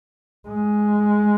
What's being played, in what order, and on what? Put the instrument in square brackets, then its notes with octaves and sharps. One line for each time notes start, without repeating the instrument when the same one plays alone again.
[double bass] G#3